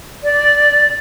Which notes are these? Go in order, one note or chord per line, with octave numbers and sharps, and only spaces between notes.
D5